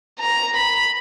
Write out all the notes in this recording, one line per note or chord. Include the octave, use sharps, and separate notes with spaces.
A#5
B5